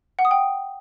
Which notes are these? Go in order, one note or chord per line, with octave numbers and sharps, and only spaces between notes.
F#5
D#6
G5